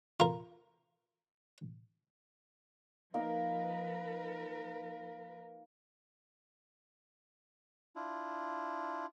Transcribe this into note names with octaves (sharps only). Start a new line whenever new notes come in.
F4 A#4
F3 A#3 D#4 A#4 B4
D4 E4 F4